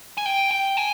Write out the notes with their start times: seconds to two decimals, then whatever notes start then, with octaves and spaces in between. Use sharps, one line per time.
0.18 G#5
0.26 G5
0.51 G5
0.77 G#5